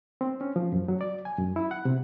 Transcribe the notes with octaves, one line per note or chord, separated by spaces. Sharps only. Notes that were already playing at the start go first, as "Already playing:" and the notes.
C4
C#4
F3
F#2
F#3
D5
G#5
F#2
E4
F#5
C3